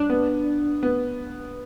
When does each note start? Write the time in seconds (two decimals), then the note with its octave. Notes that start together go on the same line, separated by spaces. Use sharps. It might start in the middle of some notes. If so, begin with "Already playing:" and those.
Already playing: D4
0.10 B3
0.83 B3